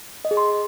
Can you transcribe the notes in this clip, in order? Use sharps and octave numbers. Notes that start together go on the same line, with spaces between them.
D#5
G#4
C6